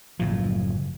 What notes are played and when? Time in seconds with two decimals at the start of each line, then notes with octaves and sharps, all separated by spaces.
0.19 F#1 A2 F3